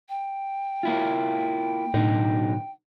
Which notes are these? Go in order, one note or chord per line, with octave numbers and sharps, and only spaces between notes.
G5
A#3 E4 F4
B1 A2 D3 D#4